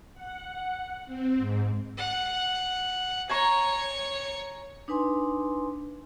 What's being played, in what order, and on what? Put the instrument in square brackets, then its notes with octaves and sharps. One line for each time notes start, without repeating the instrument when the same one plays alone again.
[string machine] F#5
F#5
C4
G#2
[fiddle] F#5
[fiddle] C#5 [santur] G#5 A#5 C#6
[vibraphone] D4 D#4 B4 G#5 C6